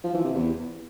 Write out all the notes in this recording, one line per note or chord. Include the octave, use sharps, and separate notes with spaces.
F3
E3
C3
E2